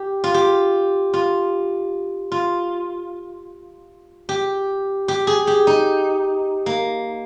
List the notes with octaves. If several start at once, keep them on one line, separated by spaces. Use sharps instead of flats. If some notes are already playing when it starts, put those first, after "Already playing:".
Already playing: G4
F4
G4
F4
F4
G4
G4
G#4
G4
D#4
A#3